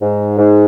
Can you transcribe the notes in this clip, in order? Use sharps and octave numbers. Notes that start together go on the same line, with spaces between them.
G#2
G#2